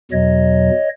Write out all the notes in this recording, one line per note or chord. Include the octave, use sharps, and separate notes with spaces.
E2 B2 F#3 C#5 D#5